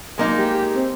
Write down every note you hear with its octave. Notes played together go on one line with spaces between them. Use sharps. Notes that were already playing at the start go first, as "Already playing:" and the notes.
F#3 G#3 A#3 D#4
G4
C4